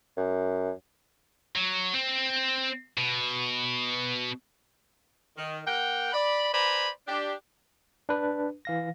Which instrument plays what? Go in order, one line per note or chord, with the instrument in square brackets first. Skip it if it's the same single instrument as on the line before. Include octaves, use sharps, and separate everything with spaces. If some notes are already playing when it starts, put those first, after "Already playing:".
[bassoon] F#2
[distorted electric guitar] F#3
C4
B2
[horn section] D#3
A#3 A#4 F#5 G5
D5 B5
B4 C5 D5 G#5 A#5 B5
D4 G4
[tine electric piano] D4 B4
E3 F5 A#6